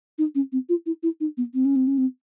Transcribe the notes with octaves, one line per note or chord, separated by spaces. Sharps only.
D#4
C#4
C4
F4
E4
E4
D#4
B3
C4
C#4
C4
C#4
C4